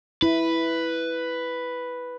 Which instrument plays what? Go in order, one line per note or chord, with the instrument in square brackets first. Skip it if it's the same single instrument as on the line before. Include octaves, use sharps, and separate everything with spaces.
[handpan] E4 [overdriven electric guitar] B4